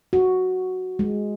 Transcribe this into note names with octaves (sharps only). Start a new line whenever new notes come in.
F#4
G#3